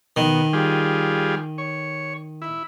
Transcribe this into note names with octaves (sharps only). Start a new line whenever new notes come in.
B2 D#3
G3 F4 G#4
C#5
E4